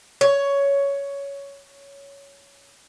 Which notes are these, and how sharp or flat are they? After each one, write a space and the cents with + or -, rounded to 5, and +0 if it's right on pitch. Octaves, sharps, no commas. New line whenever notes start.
C#5 +10